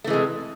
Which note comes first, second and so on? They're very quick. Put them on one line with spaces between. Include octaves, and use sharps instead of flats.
A3 E3 G#3 C3